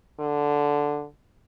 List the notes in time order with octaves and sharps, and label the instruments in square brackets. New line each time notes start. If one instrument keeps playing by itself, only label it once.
[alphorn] D3